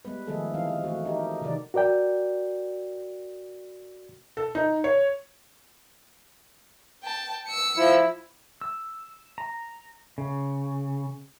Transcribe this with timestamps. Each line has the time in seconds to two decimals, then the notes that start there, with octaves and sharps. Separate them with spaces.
0.05 G3 G#3 B3 B4
0.27 D#3 F3 G#3 A3 G#4 A4
0.54 E3 C4 F5
0.84 A3 F#4
1.05 D#4 G4 A#4
1.41 C3 D#3 E3 D#4 A#4 D5
1.74 F#4 A#4 D5 G5
4.37 A4
4.55 D#4
4.84 C#5
7.03 G5 A5
7.47 E6 C#7
7.77 F3 E4
8.61 E6
9.38 A#5
10.18 C#3